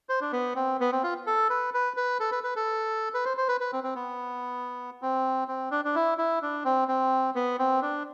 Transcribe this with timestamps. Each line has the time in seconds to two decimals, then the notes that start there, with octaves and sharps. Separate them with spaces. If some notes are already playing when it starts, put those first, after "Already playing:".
0.09 C5
0.21 D4
0.32 B3
0.56 C4
0.80 B3
0.92 C4
1.03 F4
1.27 A4
1.50 B4
1.74 B4
1.97 B4
2.20 A4
2.32 B4
2.43 B4
2.56 A4
3.14 B4
3.25 C5
3.37 C5
3.48 B4
3.61 B4
3.73 C4
3.84 C4
3.95 B3
5.02 C4
5.48 C4
5.71 D4
5.85 D4
5.95 E4
6.18 E4
6.42 D4
6.65 C4
6.88 C4
7.35 B3
7.59 C4
7.82 D4